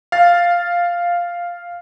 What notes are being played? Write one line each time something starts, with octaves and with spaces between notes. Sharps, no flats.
F5 A6